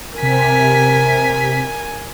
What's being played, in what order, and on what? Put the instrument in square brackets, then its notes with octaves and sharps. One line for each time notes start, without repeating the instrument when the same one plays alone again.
[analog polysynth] C3 B6 [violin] A#4 G#5